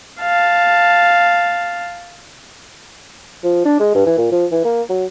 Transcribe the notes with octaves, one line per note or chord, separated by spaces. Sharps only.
F5 A5
F3
D4
G#3
G2
E3
A#2
F3
E3
A#3
F#3